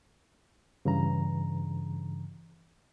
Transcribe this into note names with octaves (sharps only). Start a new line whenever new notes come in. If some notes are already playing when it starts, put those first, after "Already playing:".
G2 C#3 E3 A#5